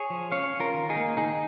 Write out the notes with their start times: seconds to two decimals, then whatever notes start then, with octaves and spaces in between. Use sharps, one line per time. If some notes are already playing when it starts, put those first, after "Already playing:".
Already playing: G#4 C#5
0.10 F3
0.32 C#4 C#5 F5
0.54 C#4
0.60 F4 A#4
0.74 D#3
0.89 D#4 G#4
0.96 A#3
1.17 D#3 D#4 G#4